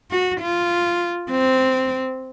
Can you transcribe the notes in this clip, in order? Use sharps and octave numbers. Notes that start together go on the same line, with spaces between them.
F#4
F4
C4